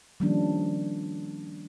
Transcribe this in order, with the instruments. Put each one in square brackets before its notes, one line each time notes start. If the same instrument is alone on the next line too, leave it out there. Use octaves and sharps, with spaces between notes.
[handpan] D#3 F3 G3 A#3 C#4 D4